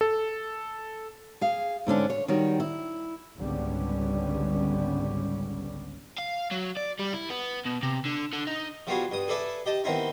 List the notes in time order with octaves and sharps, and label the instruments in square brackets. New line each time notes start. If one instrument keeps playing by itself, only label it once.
[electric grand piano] A4
[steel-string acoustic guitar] G#4 F5
G#2 D3 C#4 D4
C#5
D#3 G3 F#4 C#5
E4
[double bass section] G#1 C#2 D3 G3 B3 C#4
[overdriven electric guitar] F5
F#3
D5
G3
E4
B3
B2
C3
D3
D3
D#4
[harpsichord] F3 G3 B3 F4 F#4 G#4
G2 D#6
G#4 A4 B4 D5 E5 A5
G4 D#5 A5
D#3 B3 C4 D#4 E4